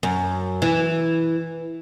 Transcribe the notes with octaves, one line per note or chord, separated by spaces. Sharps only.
F#2
E3